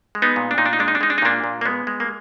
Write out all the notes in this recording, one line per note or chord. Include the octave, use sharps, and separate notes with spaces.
G#3
B3 D#4
A#2
D4
A#2 D#4
D4
D#4
G#3 D4
D#4
D4
G#3 D#4
D4
D#4
A#2 A#3 D4
A#2
A#3
G#3 B3
G#3
A#3